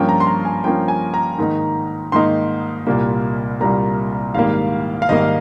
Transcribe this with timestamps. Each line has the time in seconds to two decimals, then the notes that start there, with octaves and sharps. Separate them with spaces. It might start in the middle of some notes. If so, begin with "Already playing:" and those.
Already playing: G2 F3 A#3 C#4 F4 G5
0.09 A#5
0.20 C6
0.27 A#5
0.45 G#5
0.64 G2 F3 A#3 C#4 F4 G5
0.88 G#5
1.14 A#5
1.38 G#2 D#3 A#3 D#4
2.12 G#2 D#3 A#3 D#4 C6
2.87 C2 A#2 G3 A#3
3.60 C2 A#2 G3 A#3 A#5
4.34 G#1 G#2 G3 A#3 F5
5.02 F5
5.09 G#1 G#2 G3 A#3 D#5